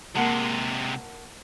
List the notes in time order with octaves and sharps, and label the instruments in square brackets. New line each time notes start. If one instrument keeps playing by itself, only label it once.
[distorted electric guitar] C3 G#3 [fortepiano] A#3 F#5 A5